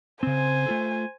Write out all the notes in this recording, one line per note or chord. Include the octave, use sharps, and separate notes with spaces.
C#3 C4 C5 G#5
A3 F4 A4